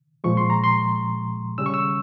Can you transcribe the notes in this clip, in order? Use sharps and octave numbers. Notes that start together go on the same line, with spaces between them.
A#2 F3 G#3 C#6
C6
A#5
C6
C#3 G3 C#4 E6
C#6
E6